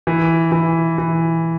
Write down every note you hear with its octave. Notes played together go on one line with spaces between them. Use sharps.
E3
E3
E3